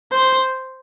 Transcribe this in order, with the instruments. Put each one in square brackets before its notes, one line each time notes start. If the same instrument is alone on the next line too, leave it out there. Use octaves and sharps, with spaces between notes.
[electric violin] C5